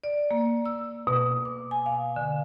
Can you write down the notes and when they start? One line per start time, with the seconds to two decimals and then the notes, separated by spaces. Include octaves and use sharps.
0.04 D5
0.31 A#3
0.66 E6
1.07 B2
1.45 D6
1.71 G#5
1.86 F5
2.16 D3